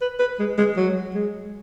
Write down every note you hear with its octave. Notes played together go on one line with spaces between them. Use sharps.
B4
B4
G#3
G#3
F#3
G#3